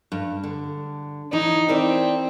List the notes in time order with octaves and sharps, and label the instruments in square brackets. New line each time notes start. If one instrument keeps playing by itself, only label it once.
[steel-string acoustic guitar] G2
D3
[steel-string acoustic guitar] E3 [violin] D#4
[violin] C4 [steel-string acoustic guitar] E4 A#4 D5